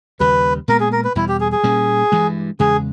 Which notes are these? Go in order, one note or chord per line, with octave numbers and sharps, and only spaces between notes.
D#2 C#3 G3 B4
A#2 G#3 B3 A#4
G#4
A#4
B4
E2 B2 G3 E4
G4
G#4
G#4
A#2 G3 A#3 C#4
G2 E3 G#3
E2 C#3 G#3 G#4